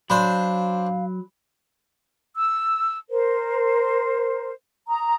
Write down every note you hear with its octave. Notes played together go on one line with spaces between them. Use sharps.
F#3 D4 C5 F5 B5
E6
A#4 C5
A#5 D#6